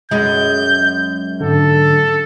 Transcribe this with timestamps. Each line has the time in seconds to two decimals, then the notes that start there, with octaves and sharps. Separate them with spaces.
0.11 F#2 G#3 G6
1.41 G#2 D3 A4